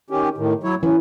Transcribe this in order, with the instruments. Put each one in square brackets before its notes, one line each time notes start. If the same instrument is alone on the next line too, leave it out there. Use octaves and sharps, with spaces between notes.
[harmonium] D#3 C#4 G4
A2 D#3
F#3 E4 C#5
[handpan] E3 [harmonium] C#4